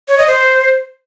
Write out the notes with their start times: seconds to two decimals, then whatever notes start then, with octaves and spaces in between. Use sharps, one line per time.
0.08 C#5
0.18 D#5
0.28 C5